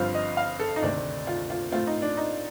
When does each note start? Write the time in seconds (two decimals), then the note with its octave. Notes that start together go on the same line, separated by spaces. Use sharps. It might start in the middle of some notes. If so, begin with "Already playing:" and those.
Already playing: G1 G2 F3 C4 F5
0.15 D#5
0.37 F5
0.60 A4
0.76 D#4
0.82 D2 C3 D#3 A3 C4 D4
1.27 F4
1.50 F4
1.72 A2 A3 C4 F4
1.87 D#4
2.02 D4
2.17 D#4